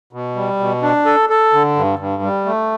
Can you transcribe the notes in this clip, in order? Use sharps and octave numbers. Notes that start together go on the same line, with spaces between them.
B2
G3
B2
D4
A4
A4
D3
G2
G2
G3
A3